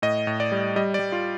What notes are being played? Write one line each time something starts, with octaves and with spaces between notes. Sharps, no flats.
A2 D#5
A2
D5
G3
G3 D#5
D5
G3
F4